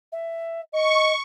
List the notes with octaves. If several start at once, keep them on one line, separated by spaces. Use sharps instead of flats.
E5
D#5 C#6